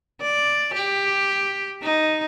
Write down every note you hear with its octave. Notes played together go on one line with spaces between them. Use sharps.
D5
G4
D#4